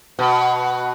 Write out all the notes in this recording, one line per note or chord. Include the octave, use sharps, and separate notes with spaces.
B2 F#4 B4 F#5